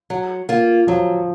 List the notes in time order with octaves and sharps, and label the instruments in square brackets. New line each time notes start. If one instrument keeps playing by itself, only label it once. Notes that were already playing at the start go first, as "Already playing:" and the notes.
[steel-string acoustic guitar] F#3
A#3 F4
[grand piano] F3 [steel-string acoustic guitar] F#3